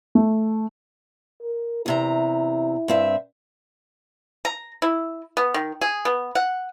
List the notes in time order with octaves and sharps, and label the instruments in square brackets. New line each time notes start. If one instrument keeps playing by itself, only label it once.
[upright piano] A3
[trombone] A#4
[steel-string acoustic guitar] E2 C3 A#5 [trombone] E4
[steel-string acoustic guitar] G2 C4 E5
[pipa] A#5
E4
B3
D#3
G#4
B3
F#5